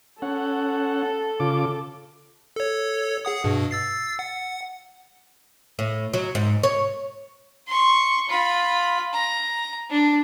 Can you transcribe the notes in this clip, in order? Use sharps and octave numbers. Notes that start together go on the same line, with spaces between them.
C#4 A4 F#5
C#3 F4 D6
A4 C#5
G#4 F#5 D#6
G2 B2
E6 A6 C7
F#5
A2
F#3
G#2
C#5
C6 C#6
F4 B5
A#5
D4